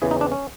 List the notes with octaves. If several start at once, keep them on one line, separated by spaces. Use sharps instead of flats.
E2 C#3 E3 G#4
D#4
D4
C#4